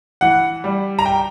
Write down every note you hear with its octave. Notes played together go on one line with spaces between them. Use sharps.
E3 F#5
G3
A#5
G5